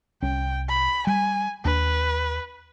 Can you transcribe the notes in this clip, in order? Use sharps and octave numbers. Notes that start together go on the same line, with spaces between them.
C2 C#4 G5
B5
G3 G#5
D#2 D4 B4